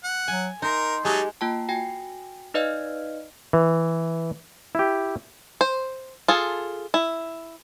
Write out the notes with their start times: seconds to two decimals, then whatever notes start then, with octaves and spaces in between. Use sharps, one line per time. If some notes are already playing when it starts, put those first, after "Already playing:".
0.04 F#5
0.28 F#3 G#5
0.62 D#4 A#4 C6
1.05 F#3 G#3 D#4 G4 A5
1.41 A#3 F4 G5 A5
1.69 F#4 G5 G#5 A#6
2.54 D#4 B4 D5 D#5 F5 F6
3.53 E3
4.75 E4 G4
5.61 C5
6.28 F4 G#4 A4
6.94 E4